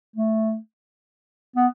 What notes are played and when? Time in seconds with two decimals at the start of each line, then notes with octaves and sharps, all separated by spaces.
0.16 A3
1.56 B3